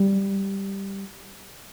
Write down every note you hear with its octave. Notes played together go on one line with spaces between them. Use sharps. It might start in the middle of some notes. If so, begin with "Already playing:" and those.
Already playing: G3